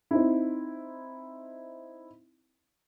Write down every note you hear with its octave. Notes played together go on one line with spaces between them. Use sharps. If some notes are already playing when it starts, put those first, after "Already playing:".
C4 D#4 E4